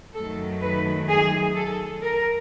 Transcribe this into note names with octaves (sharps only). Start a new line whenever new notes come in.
F#2 D#3 F#3 A3 A4
B4
G#4
A4
A#4